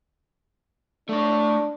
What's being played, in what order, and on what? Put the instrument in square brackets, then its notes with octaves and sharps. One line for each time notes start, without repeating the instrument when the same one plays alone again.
[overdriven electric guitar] A3 C#5 [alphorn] D4